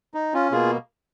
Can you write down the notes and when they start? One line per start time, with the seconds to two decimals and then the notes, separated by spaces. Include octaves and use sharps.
0.14 D#4
0.34 C#4 F4
0.52 B2 A#3 F4 G#4